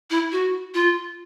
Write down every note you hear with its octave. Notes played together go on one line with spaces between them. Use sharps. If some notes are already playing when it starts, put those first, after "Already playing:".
E4
F#4
F4